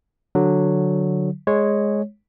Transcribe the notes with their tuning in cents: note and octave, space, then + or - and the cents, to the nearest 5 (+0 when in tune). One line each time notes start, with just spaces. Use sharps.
D3 +0 F#3 -5
G#3 +0 C#5 -10